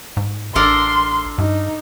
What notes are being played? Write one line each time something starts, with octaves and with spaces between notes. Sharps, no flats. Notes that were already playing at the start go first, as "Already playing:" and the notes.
G#2
A1 D4 A4 A#4 C6
G2 D#4